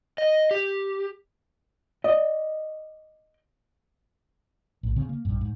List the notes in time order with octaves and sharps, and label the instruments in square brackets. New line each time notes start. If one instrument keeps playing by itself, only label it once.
[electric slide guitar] D#5
G4
[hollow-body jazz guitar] D5 D#5
[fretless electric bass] A#1 A2
C#3 C4
A#3
A#1 G2
G#2